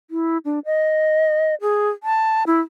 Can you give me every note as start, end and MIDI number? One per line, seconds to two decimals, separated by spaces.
0.11 0.38 64
0.45 0.59 62
0.65 1.55 75
1.61 1.89 68
2.03 2.44 81
2.47 2.60 64